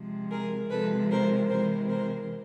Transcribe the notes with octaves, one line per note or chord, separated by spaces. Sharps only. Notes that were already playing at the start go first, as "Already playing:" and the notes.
Already playing: C3 F3 G#3
G#4 A#4
C3 F3 G#3 A4 B4
A#4 C5
C3 E3 G#3 A#4 C5
A#4 C5